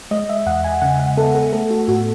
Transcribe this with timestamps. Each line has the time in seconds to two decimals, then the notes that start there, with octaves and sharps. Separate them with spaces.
0.11 G#3 D#5
0.29 E5
0.46 E2 F#5
0.64 G#5
0.82 C#3 F#5
0.99 F#5
1.17 B3 A4
1.35 A4
1.52 A3 A4
1.71 F#4
1.88 A2 F#4